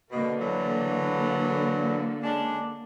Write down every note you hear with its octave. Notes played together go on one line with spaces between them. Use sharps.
B2 D3 A#3
A2 E3 F#3
G#3 C#4 D4